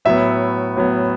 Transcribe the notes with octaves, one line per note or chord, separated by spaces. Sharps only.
A2 F#3 B3 E5
A2 F#3 B3